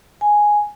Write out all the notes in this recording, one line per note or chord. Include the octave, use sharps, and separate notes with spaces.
G#5